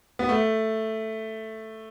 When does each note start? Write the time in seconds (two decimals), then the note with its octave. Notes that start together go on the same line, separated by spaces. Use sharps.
0.19 B3
0.29 A3